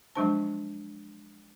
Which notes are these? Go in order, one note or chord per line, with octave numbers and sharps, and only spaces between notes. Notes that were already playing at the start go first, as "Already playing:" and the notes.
F3 F#3 G#3 D4 C5 A5